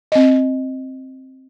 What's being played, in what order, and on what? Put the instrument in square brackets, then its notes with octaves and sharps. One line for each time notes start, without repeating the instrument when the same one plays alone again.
[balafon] C4 D#5